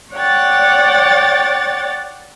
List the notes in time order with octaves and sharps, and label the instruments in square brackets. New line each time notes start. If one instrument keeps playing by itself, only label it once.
[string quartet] C#5 D5 F#5 G5 A6